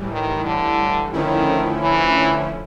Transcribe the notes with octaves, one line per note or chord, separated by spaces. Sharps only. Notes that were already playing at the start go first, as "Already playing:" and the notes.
Already playing: A2 E3 G3
D#3
D3
D3 D#3 F3 A3 C#4 E4
E3